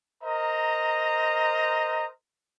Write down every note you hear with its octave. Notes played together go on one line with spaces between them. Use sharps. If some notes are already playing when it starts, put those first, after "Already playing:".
A#4 C5 D#5 A#5